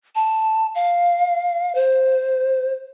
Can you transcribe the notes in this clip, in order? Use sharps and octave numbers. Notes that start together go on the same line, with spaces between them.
A5
F5
C5